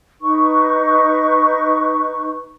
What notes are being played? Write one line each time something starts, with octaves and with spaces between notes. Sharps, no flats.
D#4 B4 C#6